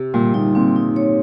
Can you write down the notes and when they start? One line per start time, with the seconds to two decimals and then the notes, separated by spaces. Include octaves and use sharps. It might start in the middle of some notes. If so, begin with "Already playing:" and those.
Already playing: C3
0.14 A#2 G3
0.34 A#2 D#4
0.55 A#2 C4
0.76 D#4
0.96 C#5